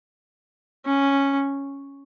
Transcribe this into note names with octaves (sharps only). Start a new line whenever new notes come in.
C#4